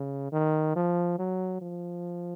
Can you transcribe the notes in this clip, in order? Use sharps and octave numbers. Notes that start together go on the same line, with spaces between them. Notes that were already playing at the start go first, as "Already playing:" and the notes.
Already playing: C#3
D#3
F3
F#3
F3